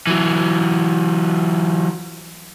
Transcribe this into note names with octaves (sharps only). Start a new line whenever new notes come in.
E3 F#3